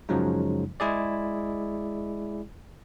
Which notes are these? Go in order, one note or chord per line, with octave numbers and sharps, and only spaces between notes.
F#2 C#3 F3 F#3 G#3 D#4
G#3 E4 G#4 D5